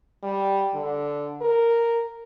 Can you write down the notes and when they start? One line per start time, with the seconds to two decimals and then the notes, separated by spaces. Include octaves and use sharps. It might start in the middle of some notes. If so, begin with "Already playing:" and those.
0.23 G3
0.74 D3
1.41 A#4